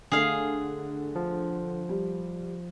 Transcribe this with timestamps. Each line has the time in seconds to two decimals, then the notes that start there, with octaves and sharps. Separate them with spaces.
0.12 D3 A3 G#4 F5
1.16 F3
1.89 G3